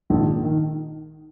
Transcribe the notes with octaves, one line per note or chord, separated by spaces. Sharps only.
A#1 G#2 D#3
D#3